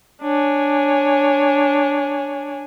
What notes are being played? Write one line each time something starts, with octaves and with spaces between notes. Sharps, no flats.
D4 C#5 G#5